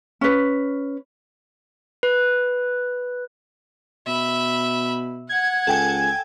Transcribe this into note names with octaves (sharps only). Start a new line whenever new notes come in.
C#4 B4
B4
B2 E5 B5
F#5 G#6
C#2 A4 G5 G#5